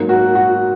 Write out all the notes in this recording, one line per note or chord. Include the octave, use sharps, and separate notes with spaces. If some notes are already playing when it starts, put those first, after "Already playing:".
Already playing: G#2 F#3 A#3
F#4 A#4
F#4